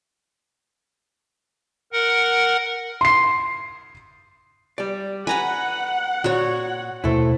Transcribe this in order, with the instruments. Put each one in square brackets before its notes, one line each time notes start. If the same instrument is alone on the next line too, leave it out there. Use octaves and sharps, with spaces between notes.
[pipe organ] A#4 F#5
[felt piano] C6 C7
[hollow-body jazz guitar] G3 D5
[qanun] B4 A#5 B5 [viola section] F#5 [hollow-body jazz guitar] G#5
[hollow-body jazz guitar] A#2 [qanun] F#4 C#5
[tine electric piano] D#2 B2 C5 [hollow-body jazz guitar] A3 E4